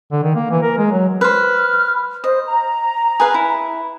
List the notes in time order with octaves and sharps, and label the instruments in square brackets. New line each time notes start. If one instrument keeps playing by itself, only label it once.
[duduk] D3
D#3
A#3
E3
A#4
G#3
F#3
[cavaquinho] B4 C5 [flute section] F6
[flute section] C5 [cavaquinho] D#5
[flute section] A#5
[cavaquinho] G#4 B4 F5
E4